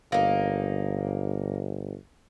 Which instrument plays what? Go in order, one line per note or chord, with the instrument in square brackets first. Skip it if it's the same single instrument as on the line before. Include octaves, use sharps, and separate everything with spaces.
[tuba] G1 [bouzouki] A#3 D#4